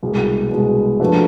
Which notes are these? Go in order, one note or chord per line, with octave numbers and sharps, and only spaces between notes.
C2 B2 G#3
C2 B2 G#3
F3 A3 D4 F#4 B4